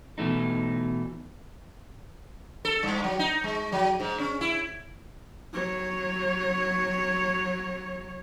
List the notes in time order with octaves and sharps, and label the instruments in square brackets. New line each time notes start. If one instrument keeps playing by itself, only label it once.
[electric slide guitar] B2 E3 A3 D#4
[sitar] A4
G2
F#3
D#4
G#3
F#3
G#2
C#4
E4
[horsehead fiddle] F#3 C#5